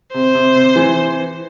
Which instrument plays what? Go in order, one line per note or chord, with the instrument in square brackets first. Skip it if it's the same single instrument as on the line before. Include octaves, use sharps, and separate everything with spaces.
[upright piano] C3 [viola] C5
[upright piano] C3
C3
E3